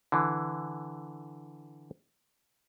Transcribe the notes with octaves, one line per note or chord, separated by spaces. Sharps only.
D3 E3